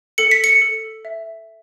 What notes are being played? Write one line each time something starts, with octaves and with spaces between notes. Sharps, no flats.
A4 C#7
B6
C#7
A4
E5